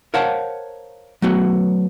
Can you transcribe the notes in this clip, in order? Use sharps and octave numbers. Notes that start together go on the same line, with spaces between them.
A#4 C5 C#5 F5 F#5 A5
F#3 A3 B3 F#4